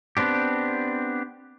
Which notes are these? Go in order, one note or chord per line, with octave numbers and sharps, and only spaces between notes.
B3 C4 D4 G4